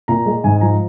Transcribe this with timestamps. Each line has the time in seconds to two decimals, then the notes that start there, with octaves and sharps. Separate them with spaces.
0.08 A#2 A#5
0.26 G#3
0.44 G#2 G#5
0.56 G#5
0.61 F3 A#5